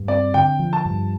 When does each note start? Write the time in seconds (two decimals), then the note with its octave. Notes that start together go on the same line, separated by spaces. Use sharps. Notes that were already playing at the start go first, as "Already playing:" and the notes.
Already playing: G2
0.08 C4 D5
0.34 D3 G5
0.59 F3
0.73 A5
0.85 G2